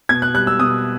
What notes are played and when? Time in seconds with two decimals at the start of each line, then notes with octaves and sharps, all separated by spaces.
0.09 B2 G#6
0.22 F#6
0.34 G3 F#6
0.47 E6
0.59 B2 D#6